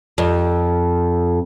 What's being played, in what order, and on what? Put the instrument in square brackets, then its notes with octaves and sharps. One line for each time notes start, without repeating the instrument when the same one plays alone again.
[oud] F2